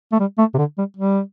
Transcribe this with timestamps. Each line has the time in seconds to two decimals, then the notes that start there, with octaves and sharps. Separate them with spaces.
0.12 A3
0.20 G3
0.38 A3
0.54 C3
0.58 D3
0.78 G3
0.97 G3